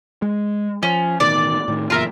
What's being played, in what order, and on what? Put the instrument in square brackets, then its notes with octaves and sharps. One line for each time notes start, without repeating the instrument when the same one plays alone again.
[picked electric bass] G#3
[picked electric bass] F3 [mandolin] C#4
[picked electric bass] A1 B2 D#3 [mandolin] D5
[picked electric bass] A2 D#3
[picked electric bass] F#1 E2 A#2 [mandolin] F4 A#4 E5